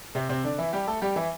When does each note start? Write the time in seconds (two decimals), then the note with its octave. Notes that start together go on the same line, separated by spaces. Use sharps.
0.15 C3 C4
0.29 C3 C4
0.44 D3 D4
0.58 E3 E4
0.73 G3 G4
0.87 A3 A4
1.02 G3 G4
1.16 E3 E4